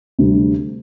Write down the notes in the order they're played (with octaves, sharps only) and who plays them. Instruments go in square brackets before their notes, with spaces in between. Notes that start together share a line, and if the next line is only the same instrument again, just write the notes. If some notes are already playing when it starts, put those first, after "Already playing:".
[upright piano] D2 C3 G3